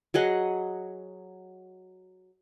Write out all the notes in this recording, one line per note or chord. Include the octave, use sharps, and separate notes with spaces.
F#3 G#4 D#5 F#5